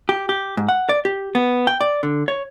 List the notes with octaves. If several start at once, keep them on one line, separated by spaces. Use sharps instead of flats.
G4
G4
G#2
F#5
D5
G4
B3
G5
D5
D3
C#5